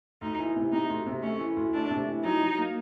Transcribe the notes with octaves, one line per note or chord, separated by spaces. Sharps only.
D2 D#4
E3
C3
C3 D#4
D2
C3
A3 C#4
E3
D2
A3 D4
C3
E3
F#3 D#4
F#3
A#3